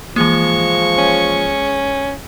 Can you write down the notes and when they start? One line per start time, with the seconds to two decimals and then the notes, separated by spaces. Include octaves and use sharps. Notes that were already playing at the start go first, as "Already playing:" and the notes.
0.16 E3 F3 G#3 A#3 C#6
0.98 C#4